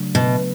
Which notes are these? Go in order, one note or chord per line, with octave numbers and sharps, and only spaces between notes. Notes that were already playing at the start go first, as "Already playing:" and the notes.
Already playing: C#3 F#3 A3 D4
B2